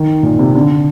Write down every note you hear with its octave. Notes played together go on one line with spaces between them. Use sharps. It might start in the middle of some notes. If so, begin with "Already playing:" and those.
Already playing: D#3
A#2
C3
D3